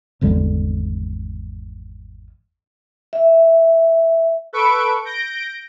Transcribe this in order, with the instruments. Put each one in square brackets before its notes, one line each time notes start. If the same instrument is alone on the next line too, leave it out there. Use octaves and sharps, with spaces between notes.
[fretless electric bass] G#1 E2 D3 G3
[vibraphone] E5
[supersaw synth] A4 B4 C#6 D7
G6 A#6 D7